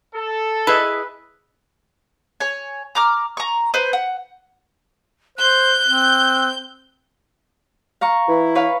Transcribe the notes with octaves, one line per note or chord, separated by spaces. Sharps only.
A4
E4 G#4 B4 D#5
C#5 G#5
A#5 D6 F6
A#5 C#6
B4 C5
F#5
C5 F#6 G6
C4
F5 A#5 C#6
E3 E4
B4 C#5 F5